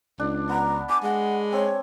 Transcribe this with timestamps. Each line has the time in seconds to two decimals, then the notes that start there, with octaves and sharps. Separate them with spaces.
0.20 C#2 D4
0.49 B3 A#5
0.89 G#5 D6
1.03 G#3 F#5
1.52 C4 C#5